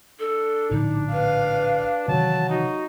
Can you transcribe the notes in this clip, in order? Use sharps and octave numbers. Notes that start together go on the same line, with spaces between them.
D4 A4
A#1 A2 D3 D#4
B4 F5
C3 D#3 E3 F#3 A5
D#4 F#4